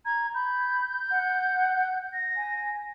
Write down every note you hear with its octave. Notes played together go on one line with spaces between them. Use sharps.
A#5 G#6
B5 G6
F#5
A#6
G#5